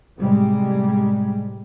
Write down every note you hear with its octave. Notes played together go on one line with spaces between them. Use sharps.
A2 C3 G3 G#3